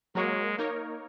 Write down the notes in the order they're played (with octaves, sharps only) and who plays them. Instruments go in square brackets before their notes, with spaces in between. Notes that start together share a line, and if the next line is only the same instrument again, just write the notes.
[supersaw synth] F#3 A#3 F#4 A#4 C#5 [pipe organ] G#3
[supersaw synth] A#3 D#4 A#4 C#5